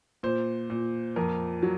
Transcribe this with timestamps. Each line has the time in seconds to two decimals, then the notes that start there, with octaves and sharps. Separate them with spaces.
0.23 A#2 C5
0.70 A#2
1.16 F2 A#4
1.63 F#3